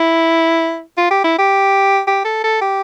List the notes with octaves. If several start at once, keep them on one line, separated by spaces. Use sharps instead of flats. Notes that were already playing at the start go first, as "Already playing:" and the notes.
Already playing: E4
F4
G4
E4
G4
G4
A4
A4
G4